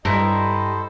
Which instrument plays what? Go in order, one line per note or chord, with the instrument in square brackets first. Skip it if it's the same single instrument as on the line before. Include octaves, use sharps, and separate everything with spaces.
[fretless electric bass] G2 [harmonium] G3 D#5 [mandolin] E4 A#5 [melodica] A4 C5